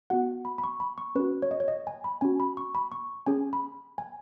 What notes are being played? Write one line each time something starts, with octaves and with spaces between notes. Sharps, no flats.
B3 F#4 F#5
B5
B5
C#6
B5
C#6
C#4 F#4 B4
C#5
D#5
C#5
D#5
G#5
B5
C#4 F#4 G#5
B5
C#6
B5
C#6
C#4 G#4 G#5
B5
G#5